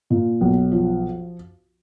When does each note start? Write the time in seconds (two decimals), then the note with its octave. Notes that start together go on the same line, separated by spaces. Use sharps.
0.10 A#2
0.41 B1
0.72 F3